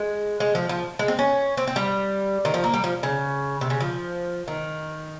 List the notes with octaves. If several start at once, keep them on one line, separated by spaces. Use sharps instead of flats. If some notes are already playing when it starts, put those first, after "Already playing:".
Already playing: G#3
G#3
F3
F3
G#3
C4
C#4
C4
C4
G3
D#3
F3
A#3
G3
F3
C#3
C3
C#3
F3
D#3